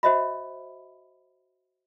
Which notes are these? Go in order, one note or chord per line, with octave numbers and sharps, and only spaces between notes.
F#4 C5 D#5 E5 B5